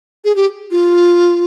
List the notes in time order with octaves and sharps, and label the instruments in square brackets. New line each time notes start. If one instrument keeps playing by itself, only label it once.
[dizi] G#4
G4
F4